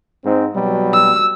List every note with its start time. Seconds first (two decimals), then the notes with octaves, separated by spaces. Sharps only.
0.24 G#2 C4 D#4
0.55 B2 F#3 G3
0.94 E6